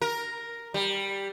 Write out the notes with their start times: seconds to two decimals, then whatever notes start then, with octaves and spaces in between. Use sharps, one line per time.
0.02 A#4
0.74 G3